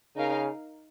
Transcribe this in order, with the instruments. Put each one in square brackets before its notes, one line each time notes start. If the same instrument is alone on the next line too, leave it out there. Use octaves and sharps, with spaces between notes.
[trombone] C#3 [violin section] D#4 A#4 F5